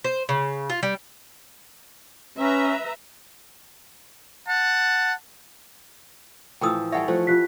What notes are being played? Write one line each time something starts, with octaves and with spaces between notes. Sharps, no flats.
C5
C#3
F4
G3
C#4 B4 E5 A#5
F#5 A5
A2 E3 F3 G5 D#6 E6
G3 A4 C#5 E5 F#5 G#5
F3 A3 C5 F#5
F4 G4 F#6 B6